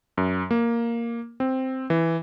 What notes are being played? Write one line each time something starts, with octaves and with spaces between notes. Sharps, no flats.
F#2
A#3
C4
E3